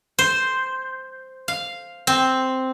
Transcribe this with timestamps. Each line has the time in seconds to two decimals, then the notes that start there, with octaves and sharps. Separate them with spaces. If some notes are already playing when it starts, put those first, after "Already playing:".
0.19 C5
1.48 F5
2.07 C4